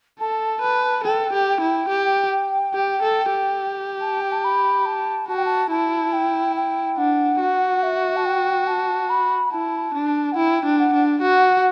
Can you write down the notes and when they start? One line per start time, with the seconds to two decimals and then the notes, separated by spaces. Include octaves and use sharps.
0.20 A4 A5
0.62 B4
1.04 A4 G5
1.33 G4
1.61 E4
1.89 G4
2.74 G4
3.02 A4
3.31 G4
4.01 A5
4.21 G5
4.32 A5
4.44 B5
4.86 A5
5.28 F#4 A5
5.37 G5
5.45 A5
5.71 E4 A5
6.13 G5
6.56 G5
6.98 D4 F#5
7.40 F#4
7.83 E5
8.16 A5
8.25 G5
8.67 A5
9.09 B5
9.51 E4 A5
9.94 D4
10.32 F#5
10.36 E4 G5
10.65 D4
10.79 F#5
10.93 D4
11.22 F#4 F#5